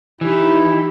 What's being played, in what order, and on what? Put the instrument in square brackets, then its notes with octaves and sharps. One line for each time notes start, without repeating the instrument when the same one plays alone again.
[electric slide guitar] E3 [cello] D#4 G4 [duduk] E4